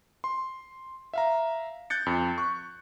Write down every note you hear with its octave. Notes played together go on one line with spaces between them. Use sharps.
C6
E5 F5 A#5
F#6 G6 A6 C#7
F2
C#6 F#6